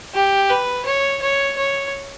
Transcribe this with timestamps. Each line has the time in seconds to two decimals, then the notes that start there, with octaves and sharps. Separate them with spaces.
0.14 G4
0.50 B4
0.86 C#5
1.22 C#5
1.57 C#5